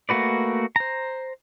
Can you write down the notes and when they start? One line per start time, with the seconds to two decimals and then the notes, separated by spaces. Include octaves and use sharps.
0.09 A3 A#3 F#4 B4 D5
0.76 C5 A#5